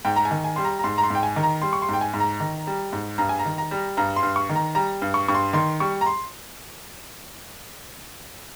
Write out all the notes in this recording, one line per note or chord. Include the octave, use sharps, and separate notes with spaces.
G#2 G5
A#5
G#5
D#3
G#5
G3 C6
A#5
A#5
G#2 C6
A#5
C6
G#2 G5
G#5
D#3
A#5
G3 C6
C#6
C6
G#2 G5
G#5
G#2
A#5
D#3
G3
G#2
G2 A#5
G#5
A#5
D#3
A#5
G3
G2 A#5
C6
G2
C#6
D#3
A#5
G3 A#5
G2
C#6
G2 C#6
C6
D#3 C6
G3 C#6
A#5
C6